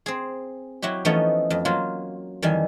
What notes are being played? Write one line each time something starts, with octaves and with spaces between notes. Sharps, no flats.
C4 G#4
F#3 E4 F#4 G4
E3 F3 A3 B3 C#4 D#4
F2
F#3 A#3 F4
F2 D#3 E3 G3 G#5